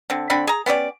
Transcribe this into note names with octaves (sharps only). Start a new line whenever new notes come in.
D3 C4
D3 C4 D4 B5
G#4 A#5
B3 C#4 G4 D5